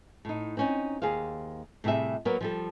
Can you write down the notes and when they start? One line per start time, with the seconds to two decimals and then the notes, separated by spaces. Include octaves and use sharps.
0.25 A2 D#4
0.57 C4 C#4 D#4
1.02 D#2 G#4 C5 F5
1.84 A2 C3 G3 G#4 E5
2.25 F#3 A#3 B3 A#4
2.41 F3 G3 A4